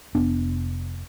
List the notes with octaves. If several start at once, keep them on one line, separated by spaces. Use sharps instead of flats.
F1 B3 D4